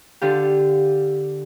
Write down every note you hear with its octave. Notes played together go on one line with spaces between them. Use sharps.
D3 F4 G4